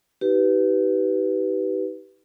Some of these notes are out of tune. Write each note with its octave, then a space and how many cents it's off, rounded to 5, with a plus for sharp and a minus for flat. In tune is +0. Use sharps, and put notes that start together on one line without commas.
D#4 +35 G4 -25 B4 +0